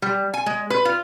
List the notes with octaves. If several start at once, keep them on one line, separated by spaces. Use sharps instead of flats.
G3
G#5
G#3
B4
F4